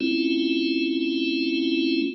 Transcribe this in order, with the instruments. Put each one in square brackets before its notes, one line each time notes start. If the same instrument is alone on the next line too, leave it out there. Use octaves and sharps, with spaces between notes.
[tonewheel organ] A3 C4 C#4 E4 F4